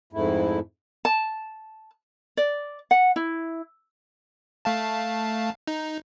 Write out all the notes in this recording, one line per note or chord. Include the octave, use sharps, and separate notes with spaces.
F2 G#2 A3 E4
A5
D5
F#5
E4
A3 F5 A5
D#4